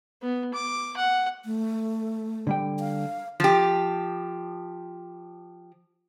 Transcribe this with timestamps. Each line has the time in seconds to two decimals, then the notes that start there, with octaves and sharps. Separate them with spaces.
0.22 B3
0.54 D6
0.97 F#5
1.45 A3
2.47 D3 G3 G5
2.80 F5
3.40 F3 G4